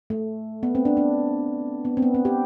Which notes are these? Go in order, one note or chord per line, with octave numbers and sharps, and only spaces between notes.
A3
B3
C4
D4
D4
B3
C4
B3
C4
G4